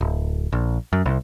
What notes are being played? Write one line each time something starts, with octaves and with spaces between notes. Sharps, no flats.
D1
A#1
F#2
C2